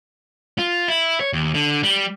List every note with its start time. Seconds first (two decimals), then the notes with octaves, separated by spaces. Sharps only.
0.58 F4
0.88 E4
1.21 C#5
1.33 D#2
1.54 D3
1.83 G3